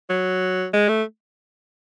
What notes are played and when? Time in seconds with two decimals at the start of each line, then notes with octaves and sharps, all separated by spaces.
0.10 F#3
0.74 G#3
0.88 A3